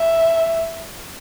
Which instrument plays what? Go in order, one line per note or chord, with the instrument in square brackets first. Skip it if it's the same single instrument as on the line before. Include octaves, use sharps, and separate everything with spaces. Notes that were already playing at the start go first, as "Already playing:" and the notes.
Already playing: [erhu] E5